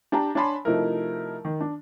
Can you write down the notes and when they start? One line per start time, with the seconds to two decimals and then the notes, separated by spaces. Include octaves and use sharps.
0.12 D4 G4 G5 A5 A#5
0.35 D4 C#5 G#5 A5 B5 C6
0.65 C3 F3 A3 D#4 E4 A#4
1.45 D#3
1.61 D4